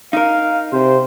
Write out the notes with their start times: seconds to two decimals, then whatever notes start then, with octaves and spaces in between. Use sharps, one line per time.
0.13 D#4 A#4 F5
0.73 C3 C5